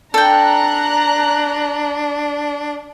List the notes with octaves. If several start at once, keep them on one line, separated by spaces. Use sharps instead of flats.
D4 A4 G5 A#5 F#6